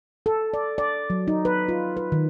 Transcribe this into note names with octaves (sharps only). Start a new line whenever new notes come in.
A4
D5
D5
F#3
D#4
B4
F4
B4
D#3